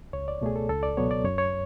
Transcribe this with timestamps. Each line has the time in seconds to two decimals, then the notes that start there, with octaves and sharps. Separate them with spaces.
0.13 C#2 C#5
0.28 D5
0.42 B2 A3 G#4
0.56 A4
0.69 C#2 A4
0.83 D5
0.97 B2 F#3 B3 C#5
1.11 D5
1.24 F#2 C#5
1.38 C#5